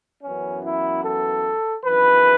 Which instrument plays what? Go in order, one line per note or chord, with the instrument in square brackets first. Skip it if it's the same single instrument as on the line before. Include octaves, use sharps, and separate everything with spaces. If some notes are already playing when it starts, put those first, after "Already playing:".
[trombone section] F#2 E3 B3 C#4
E4
A4
G#1 F#2 E3 B4